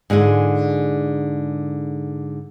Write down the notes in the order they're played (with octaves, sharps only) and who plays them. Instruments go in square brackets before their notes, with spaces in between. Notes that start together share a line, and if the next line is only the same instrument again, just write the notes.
[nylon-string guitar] G#2 D3 F4 G#4